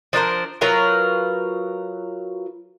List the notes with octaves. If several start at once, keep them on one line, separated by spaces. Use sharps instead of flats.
F3 D4 A#4 C5
F#3 F4 A#4 B4